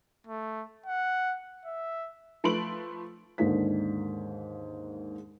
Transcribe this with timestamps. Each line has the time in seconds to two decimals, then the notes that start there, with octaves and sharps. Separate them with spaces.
0.27 A3
0.86 F#5
1.65 E5
2.44 F3 A3 B4 C6 D7 F#7
3.38 D#2 G#2 D3 A#3 B6